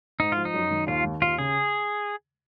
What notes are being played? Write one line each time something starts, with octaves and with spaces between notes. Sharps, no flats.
G#2 D#4
F3 F4
D#4
F#2
D#3
D#2 F4
D#3
D#2 F4
C#3 G#4